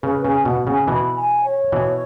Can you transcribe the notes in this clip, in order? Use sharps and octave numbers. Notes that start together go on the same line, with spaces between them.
C#3 B4
C#3 G#5
B2 F#5
C#3 G#5
B2 E3 B5
G#5
C#5
B2 E3